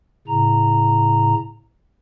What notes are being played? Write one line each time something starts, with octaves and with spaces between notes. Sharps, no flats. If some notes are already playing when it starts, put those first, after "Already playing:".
A2 C#3 A#5